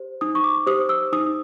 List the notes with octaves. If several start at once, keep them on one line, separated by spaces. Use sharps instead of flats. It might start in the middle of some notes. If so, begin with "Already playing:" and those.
Already playing: G4 C5
D#4 D#6
C#6
D6
G4 C5 D#6
E6
D#4 D#6